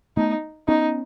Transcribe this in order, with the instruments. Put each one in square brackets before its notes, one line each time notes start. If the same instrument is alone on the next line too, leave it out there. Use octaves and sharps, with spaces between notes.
[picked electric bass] A3 B3 [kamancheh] D#4
[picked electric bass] B3 C#4 [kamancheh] D#4